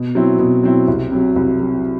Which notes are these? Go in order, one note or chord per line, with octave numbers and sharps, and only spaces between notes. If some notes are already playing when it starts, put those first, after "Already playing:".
Already playing: B2
F#3 C4 E4
B2
F#3 C4 E4
C2
C3 F#3
C2
C3 F#3